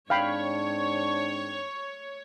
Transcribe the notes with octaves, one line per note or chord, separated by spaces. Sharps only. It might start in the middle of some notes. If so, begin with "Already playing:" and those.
G#2 C4 D4 C#5 F5 G5 B5